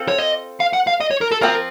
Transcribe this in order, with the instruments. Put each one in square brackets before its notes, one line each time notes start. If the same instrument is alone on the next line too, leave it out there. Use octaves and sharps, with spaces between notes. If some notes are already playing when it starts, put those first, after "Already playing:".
Already playing: [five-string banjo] C4 F4 A4
[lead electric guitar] C#5
D#5
F5
F#5
F5
D#5
C#5
A#4
A4
[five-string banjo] F3 C4 F4 [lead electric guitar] A#4